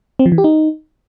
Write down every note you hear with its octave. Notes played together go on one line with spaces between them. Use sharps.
C4
F3
E3
G4
D#4